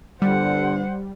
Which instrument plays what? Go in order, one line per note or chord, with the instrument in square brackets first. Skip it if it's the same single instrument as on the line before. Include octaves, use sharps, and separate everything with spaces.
[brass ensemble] G1 D3 [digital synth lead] G3 [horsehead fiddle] C5 F#5